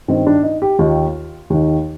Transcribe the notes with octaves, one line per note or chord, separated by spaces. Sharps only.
G2 D#3 C4
D4
D#4
G4
D#2 D#3 F4
D#2 D#3